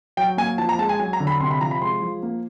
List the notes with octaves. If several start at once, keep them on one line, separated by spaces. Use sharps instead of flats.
F#3 G5
A#3 G#5
F3 A5
A#5
G#3 A5
G#5
F#3 G#5
A#5
D3
B5
C3 C6
B5
F3 A#5
B5
G#3 C6
F3
A#3